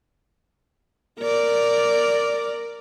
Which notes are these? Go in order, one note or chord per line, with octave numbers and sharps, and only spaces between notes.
A#4 D5